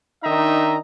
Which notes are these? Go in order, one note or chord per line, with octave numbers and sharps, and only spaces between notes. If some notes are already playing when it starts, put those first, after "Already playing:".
D#3 D4 D#4 D#5 E5 A#5